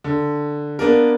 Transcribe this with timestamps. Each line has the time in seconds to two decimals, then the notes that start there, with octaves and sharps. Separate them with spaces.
0.04 D3
0.79 A#3 B3 D4 A#4